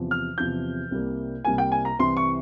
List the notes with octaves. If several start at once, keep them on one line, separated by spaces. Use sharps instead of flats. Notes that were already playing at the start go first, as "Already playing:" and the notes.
Already playing: E2 C3 F3
F6
E2 C3 F3 G6
C2 C3 G3 A#3
C2 C3 G3 A#3 G#5
G5
G#5
A#5
C2 C3 E3 C6
C#6